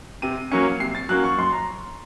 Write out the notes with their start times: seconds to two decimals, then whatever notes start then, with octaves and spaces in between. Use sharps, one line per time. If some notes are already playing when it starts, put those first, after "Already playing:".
0.22 C3 D#7
0.52 F#3 A#3 C#4 C#7
0.80 C3 C7
0.95 A6
1.09 F#3 A#3 C#4 F#6
1.24 C#6
1.38 F#2 C6
1.52 A#5